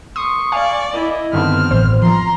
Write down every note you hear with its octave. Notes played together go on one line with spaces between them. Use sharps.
C6 C#6 D#6
D5 F5 G#5
E4 D#5
G2 D3 D#3 B3 C4 F6
A1 C5
F3 A#5 C6